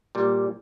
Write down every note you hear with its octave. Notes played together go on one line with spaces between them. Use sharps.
A#2 G3